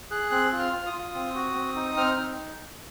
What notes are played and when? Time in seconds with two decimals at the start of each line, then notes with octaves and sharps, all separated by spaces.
0.10 G#4 F#6
0.31 C4 F#6
0.52 F4
0.59 F6
0.73 F4
0.86 D#6
0.93 F4
1.15 C4
1.35 F#4
1.55 C4
1.75 D#4
1.97 C4 F6
2.17 D#4